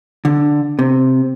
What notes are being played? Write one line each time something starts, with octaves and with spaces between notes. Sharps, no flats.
D3
C3